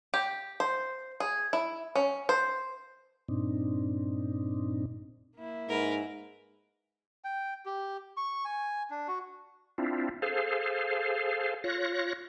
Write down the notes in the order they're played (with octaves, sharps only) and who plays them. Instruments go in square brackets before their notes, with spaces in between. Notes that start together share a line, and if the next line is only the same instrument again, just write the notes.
[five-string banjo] G4
C5
G#4
E4
C#4
C5
[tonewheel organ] G2 A#2 C4 D4 D#4
[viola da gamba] A#3 E4
[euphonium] G#2 [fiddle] A#4 B4
[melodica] G5
G4
C#6
G#5
D4
F#4
[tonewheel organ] C4 D4 E4 F4
G#4 A4 C5 F5
F4 C#5 F#6 A#6